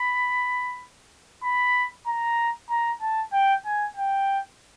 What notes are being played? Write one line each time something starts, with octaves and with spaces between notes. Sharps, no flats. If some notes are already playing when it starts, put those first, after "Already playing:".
Already playing: B5
B5
A#5
A#5
A5
G5
G#5
G5